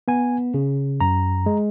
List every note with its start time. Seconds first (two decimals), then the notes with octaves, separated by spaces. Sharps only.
0.08 B3 G#5
0.54 C#3
1.01 F#2 A#5
1.46 G#3